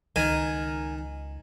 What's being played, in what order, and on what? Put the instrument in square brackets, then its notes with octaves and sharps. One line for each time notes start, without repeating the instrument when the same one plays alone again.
[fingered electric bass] C#2 [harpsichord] D#3 [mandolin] A#4 G#5